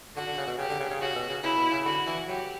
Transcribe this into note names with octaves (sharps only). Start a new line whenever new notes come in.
D3 F#4
D3
C#3
B2
C#3 G4
D3
C#3
C#3
C#3 F#4
B2
C#3
C#3 E4
B2
C#3
D3 F#4
E3
F#3 G4